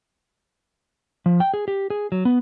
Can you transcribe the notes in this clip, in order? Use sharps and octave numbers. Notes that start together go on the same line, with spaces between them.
F3
G5
G#4
G4
G#4
F#3
B3